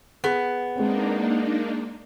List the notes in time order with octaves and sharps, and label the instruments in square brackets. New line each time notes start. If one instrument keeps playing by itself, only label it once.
[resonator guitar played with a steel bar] B3 [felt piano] G#4
[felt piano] G#3 C4 [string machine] A#3 D4 D#4